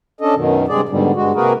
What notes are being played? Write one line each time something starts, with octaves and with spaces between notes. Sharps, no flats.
C#4 D4 A4 D#5
F#2 B2 D#3
G2 C3 G#3 G#4 D5
G#2 B2 D3 G3
G2 G#3 F#4
C3 A#3 F#4 G#4 A#4 B4